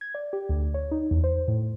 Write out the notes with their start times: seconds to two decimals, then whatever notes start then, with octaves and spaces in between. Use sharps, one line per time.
0.01 G#6
0.15 D5
0.33 G4
0.49 D2
0.74 C#5
0.91 D#4
1.11 E2
1.24 C5
1.48 A2